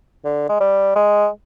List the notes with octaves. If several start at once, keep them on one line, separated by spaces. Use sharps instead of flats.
D3
G#3
G3
G#3